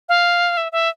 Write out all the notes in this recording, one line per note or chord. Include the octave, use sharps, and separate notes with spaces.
F5
E5
E5